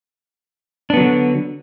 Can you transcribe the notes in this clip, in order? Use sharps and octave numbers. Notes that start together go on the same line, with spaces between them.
D3 F#3 B3 D4